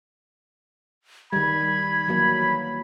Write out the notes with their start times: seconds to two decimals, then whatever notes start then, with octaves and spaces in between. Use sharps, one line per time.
1.33 D#3 G3 B5 G#6
2.08 E3 F#3 A#3